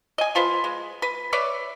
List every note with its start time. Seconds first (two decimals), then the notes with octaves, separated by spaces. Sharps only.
0.18 D#5 G#5
0.35 F3 F4 B4 C5
0.64 G#3
1.02 B4
1.33 B4 C#5 D5 E5